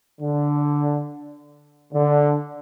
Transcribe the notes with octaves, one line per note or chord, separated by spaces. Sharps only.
D3
D3